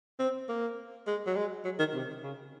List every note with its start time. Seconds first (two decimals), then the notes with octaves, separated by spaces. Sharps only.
0.19 C4
0.49 A#3
1.07 G#3
1.27 F#3
1.36 G#3
1.65 F#3
1.79 D#3
1.94 C3
2.23 C#3